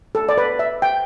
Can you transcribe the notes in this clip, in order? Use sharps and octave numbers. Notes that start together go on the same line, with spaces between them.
A4
D5
B4
E5
G5